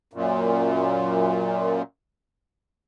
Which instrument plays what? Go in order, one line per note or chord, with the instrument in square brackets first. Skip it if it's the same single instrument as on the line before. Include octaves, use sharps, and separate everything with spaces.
[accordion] F#2 A#2